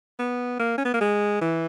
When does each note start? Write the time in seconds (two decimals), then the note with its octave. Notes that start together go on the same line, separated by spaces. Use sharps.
0.19 B3
0.60 A#3
0.78 C#4
0.85 B3
0.94 A#3
1.01 G#3
1.41 E3